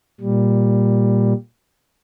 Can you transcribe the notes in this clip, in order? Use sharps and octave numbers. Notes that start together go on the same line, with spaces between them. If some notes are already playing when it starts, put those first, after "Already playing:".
A#2 G3